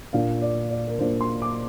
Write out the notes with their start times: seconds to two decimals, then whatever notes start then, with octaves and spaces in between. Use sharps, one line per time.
0.13 A#2 A#3 D4 F4 F5
0.42 D5
0.71 D5
0.87 A#4
0.99 A#2 A#3 D4 F4 C5
1.21 C6
1.42 D6